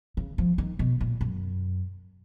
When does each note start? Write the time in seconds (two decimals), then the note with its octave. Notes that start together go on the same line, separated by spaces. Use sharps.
0.17 C#3
0.38 F3
0.58 D#3
0.79 B2
1.01 A#2
1.21 F#2